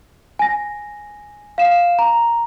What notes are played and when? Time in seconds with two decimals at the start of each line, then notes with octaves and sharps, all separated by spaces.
0.39 G#5 A#6
1.58 F5 E7
1.99 A#5